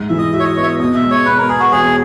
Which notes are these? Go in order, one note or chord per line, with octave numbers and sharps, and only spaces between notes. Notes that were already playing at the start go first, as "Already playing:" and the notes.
Already playing: G#2
E3 E5
D#5
F#4 E5
C#5
D#5
B3 C#5
E5
D#5
B2 D#5
E5
G#3
C#5
B2 B4
A#4
B3 G#4
F#4
E1 G#4